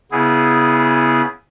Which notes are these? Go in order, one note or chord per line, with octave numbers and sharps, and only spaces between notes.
C#3 B3 E4 G#4